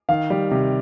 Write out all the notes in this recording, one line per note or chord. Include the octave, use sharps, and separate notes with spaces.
D#3 F5
G3
C3